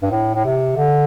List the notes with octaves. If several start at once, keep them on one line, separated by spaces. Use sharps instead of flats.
G2
A2
A2
C3
D3